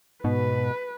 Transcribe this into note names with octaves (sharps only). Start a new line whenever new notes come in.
G#2 B2 B4